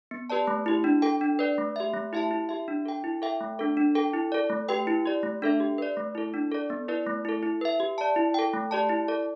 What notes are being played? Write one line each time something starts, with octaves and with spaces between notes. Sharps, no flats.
B3
G4 B4 D5 A5
A3
E4 G4
D4
A4 G5
D4
B4 D5
A3
G4 E5
A3
E4 G4 E5 A5
E4
G4 E5
D4
A4 G5
E4
A4 E5 G5
A3
D4 A4
D4
A4 G5
E4
A4 D5
A3
G4 B4 G5
E4
G4 D5
A3
D4 A4 E5
G4
B4 D5
A3
E4 A4
D4
A4 D5
B3
E4 B4 D5
A3
E4 A4
E4
B4 E5
G4
D5 A5
E4
A4 G5
A3
G4 D5 A5
E4
A4 D5